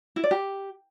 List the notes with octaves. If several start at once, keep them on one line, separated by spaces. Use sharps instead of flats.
E4
D5
G4